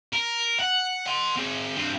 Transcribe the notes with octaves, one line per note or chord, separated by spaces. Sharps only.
A#4
F#5
F#5 C6
C4 G#4
G2 C4